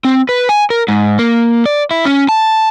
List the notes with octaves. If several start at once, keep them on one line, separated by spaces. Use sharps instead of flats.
C4
B4
G#5
A#4
G#2
A#3
D5
E4
C#4
A5